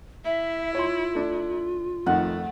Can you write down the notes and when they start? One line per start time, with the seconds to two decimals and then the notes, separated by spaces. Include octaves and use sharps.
0.24 E4 E5
0.75 F4 C#5 C6
1.15 A3 D4
2.06 F2 D#3 A3 F#5